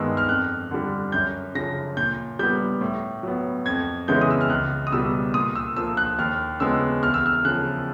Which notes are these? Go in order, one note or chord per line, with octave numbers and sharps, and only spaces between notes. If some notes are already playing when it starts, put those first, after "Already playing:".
Already playing: G2 D#3 G#3 B3 E6
F6
F2 F#6
D3 G3
F#2 G6
C#3 F3 A#6
A#2 G6
G3 B3 G6
A2
F#3 B3
F2 G#6
C#3 E3 G#3 B3 G6
D#6
E6
F6
C#2 F#6
D#6
B2 G3 B3 E6
A#2 D#6
E6
F3 A#3 E6
F#6
D#2 F6
C#3 F3 G#3 B3 E6
E2 F6
E6
F6
C#3 F3 F#6